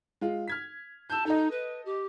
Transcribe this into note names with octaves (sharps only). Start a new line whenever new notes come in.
G#3 F4
F6 G#6 B6
A5 E6 G6
D#4 A4 D#5
B4
G4